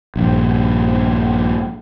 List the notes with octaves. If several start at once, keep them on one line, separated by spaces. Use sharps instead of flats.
A#1 G2